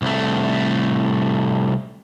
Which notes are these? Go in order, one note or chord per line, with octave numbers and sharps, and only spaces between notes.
C2 A3